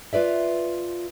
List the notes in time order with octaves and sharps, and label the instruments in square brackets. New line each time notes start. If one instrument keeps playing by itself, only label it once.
[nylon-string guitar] F4 B4 D5 E5